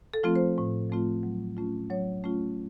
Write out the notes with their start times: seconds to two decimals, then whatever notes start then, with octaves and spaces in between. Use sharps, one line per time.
0.14 A4
0.23 F3 A3 C4 F4
0.36 C5
0.58 A2
0.90 F3 A3 C4 F4
1.23 F#3
1.57 A3 C#4 F4
1.90 F#3 C#5
2.24 A3 C#4 F4